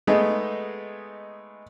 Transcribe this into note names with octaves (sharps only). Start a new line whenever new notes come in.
G#3 A3 B3 D#4 G#4